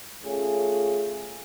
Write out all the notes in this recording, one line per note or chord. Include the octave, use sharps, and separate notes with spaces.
A3 C#4 F4 G#4